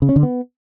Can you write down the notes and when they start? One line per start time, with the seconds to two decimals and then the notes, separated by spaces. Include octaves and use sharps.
0.02 C#3
0.09 C#4
0.16 D3
0.23 B3